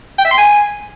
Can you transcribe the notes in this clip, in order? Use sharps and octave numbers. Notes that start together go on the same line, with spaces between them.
G5
E5
C6
G#5